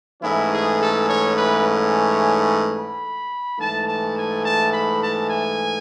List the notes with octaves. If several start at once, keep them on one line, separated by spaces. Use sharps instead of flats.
G#2 E3 A3 C#4 E4
G#4
A4
C#5
B4
C#5
B5
G#2 E3 A3 A5
A5
G#5
A5
B5
A5
G#5